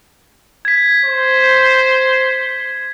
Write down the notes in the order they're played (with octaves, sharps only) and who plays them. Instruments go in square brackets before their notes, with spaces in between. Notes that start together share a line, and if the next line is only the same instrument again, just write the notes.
[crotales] G#6 B6
[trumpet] C5